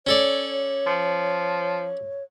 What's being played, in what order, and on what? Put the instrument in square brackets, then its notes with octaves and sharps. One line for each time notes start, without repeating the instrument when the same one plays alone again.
[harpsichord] C#4 A4 D5 [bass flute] C#5
[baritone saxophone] F3